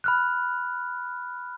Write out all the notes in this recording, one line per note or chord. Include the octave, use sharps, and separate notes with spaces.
B5 F6 F#6